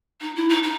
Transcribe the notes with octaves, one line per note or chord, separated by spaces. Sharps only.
D#4
E4
D#4
D#4